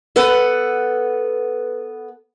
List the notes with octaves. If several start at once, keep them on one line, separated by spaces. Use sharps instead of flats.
B3 A4 B4 F#5